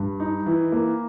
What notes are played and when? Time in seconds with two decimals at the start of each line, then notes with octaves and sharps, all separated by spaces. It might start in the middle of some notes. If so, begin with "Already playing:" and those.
Already playing: G2
0.20 D#4
0.46 E3
0.72 A#3